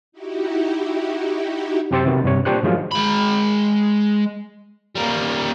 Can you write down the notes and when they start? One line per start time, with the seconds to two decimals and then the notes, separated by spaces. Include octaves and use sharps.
0.12 D#4 E4 F#4 G4
1.91 F#2 C3 G4 C5 E6 A6
2.05 C3 D#3 B3 F#4
2.24 G2 C3 C#5
2.45 A#2 D4 G4 C5 C#6 F#6
2.63 G#2 D#3 F3 F#3 G#3 F4
2.91 G#3 B5
4.95 G3 A#3